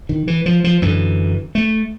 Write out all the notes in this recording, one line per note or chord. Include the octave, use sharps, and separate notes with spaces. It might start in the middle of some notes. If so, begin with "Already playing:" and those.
D#3
E3
F3
F3
F#2 D3 E3
A3